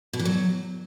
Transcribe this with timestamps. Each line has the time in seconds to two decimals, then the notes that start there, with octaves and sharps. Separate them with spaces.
0.13 B2
0.19 E3
0.25 F#3